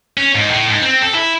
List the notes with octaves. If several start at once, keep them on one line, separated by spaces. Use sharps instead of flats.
C#4
G#2
A2
G#2
C4
A4
E4